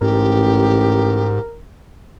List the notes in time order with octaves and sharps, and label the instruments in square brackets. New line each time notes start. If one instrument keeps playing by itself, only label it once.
[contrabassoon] A1 [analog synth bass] G#2 [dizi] G4 [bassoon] A#4